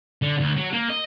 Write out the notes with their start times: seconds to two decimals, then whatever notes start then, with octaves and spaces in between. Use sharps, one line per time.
0.22 D3
0.40 D2
0.57 F#3
0.73 A#3
0.90 D#5